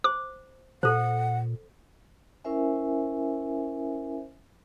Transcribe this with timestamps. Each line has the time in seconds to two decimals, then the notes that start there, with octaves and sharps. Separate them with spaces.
0.04 C5 D6
0.83 A#2 A4 C5 F#5
2.44 C#4 E4 A#4 C5 E5 G#5